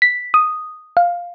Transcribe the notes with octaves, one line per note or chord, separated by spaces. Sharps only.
B6
D#6
F5